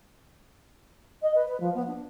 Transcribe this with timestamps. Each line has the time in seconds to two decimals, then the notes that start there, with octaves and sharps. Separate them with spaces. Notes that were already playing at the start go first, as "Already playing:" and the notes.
1.22 D#5
1.35 B4
1.48 B4
1.60 F3
1.74 B3
1.87 D4